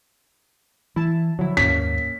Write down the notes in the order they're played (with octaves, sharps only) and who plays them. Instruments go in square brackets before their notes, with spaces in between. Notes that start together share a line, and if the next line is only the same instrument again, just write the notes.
[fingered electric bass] E3 [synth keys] E4 A5
[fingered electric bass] D3 F3 [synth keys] F#3 E4
[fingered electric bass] D#2 G#2 [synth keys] A#3 C#4 [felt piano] B6